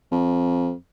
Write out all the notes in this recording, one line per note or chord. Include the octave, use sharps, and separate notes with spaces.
F2